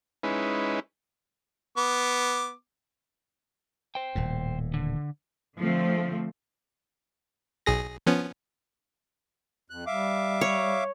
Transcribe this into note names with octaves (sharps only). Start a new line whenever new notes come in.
G#3 C#4 D#4 E4 B4
B3 D6
C5 G5
D#1 A2
D3
D3 F3 A3 C4
B1 G#4 A#6
F3 B3 C#4
F2 F#6
G3 E5 F5 D6
C#5